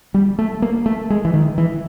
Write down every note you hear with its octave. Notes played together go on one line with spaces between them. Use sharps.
G3
A3
A#3
A3
G#3
E3
D#3
E3